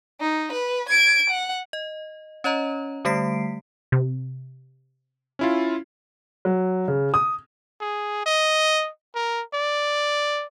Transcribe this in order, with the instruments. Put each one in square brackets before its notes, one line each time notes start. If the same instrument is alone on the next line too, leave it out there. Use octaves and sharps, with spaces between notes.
[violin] D#4
B4
G#6 D7
F#5
[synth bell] D#5
C#4 C#5 D#5 A#5
D3 G3 A3 B6 C7 D7
[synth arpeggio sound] C3
[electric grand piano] C#4 E4 F4
[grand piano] F#3
C#3
D#6
[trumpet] G#4
D#5
A#4
D5